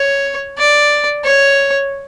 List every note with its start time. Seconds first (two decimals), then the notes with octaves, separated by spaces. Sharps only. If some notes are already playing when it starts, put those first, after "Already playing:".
Already playing: C#5
0.57 D5
1.25 C#5